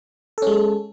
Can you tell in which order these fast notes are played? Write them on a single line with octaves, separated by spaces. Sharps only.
A4 C#4 G#3